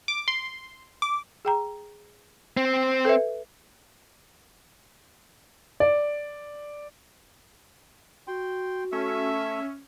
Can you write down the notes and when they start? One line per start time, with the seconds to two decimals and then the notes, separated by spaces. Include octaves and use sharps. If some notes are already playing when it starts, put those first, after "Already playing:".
0.08 D6
0.28 C6
1.02 D6
1.45 G#4 G5 A#5
2.57 C4
3.05 A4 B4 E5
5.80 D5
8.28 F#4 G5 C6
8.93 A3 C#4 A4 E5